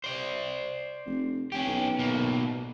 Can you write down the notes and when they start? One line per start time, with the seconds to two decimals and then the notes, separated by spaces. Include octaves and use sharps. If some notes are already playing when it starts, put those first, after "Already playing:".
0.04 C5 D5
1.06 F1
1.52 F1 C#4 G4
1.66 B1
1.99 B2 A#3